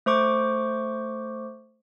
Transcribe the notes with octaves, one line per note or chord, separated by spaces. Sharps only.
A3 C5 C#6 D6